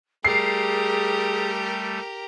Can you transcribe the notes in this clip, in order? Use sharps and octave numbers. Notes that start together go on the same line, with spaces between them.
G3 A3 G4 G#4 A#4 C7